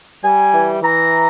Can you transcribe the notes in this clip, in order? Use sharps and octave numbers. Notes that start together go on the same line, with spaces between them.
G3 G#5
E3
E3 A#5